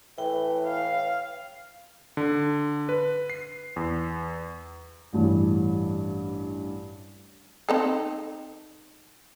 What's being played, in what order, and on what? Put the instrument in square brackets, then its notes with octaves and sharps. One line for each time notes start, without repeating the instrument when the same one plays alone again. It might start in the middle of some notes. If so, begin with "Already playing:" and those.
[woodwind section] A2 E3 [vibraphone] G5
[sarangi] F5
[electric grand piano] D3
B4
C7
E2
[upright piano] A1 G2 E3
[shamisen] C4 D#4 A4